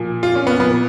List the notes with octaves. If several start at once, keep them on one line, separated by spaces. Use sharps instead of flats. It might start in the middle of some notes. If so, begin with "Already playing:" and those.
Already playing: A#2 F3
F4
C#4
B3
A#2 F3 B3